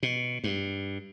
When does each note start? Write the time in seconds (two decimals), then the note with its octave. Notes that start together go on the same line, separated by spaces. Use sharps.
0.03 B2
0.44 G2